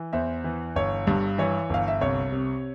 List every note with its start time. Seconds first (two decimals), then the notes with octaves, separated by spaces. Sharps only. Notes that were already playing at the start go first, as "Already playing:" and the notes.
Already playing: E3
0.13 E2 C5 E5
0.44 E3
0.76 G1 C#5
1.07 G2
1.38 E3 C#5
1.70 G1 F5
1.88 E5
2.01 C2 C#5
2.32 C3